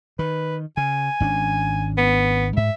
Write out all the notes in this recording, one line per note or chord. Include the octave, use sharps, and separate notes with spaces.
D#3 B4
C#3 G#5
G#1 C#4 D4
B3
G#2 E5